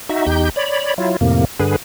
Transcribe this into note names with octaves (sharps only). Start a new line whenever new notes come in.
D#4 F#4 E5
E2 D#4 G4 G6
C#5 D5 B5
F#3 E4 F4
F2 A2 C3 A#3
G2 D3 G#4 B4